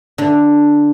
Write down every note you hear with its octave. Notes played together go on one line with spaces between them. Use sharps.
D3